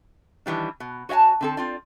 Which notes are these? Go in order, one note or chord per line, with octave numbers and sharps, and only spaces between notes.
D#3 E3 G3 D4
B2
F#4 C#5 D#5 G#5 A5
D3 C4 A4
C4 F4 D5